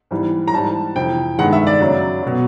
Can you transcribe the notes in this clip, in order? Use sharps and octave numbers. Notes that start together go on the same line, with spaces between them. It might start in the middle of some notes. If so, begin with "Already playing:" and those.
G#2 E3 G3
A#5
G#2 E3 G3 A5
F2 C3 E3 G5
G2 D#3 G#3 F#5
E5
D5
F#2 C#3 F#3
B2 F#3